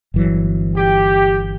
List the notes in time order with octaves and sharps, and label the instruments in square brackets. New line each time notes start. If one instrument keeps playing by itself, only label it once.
[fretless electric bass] G1 E3 F#3
[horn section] G4